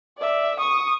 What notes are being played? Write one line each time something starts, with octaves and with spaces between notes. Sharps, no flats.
D5 E5
C#6 D#6